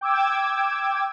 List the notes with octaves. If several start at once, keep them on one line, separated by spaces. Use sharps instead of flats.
G5 D6 E6 G#6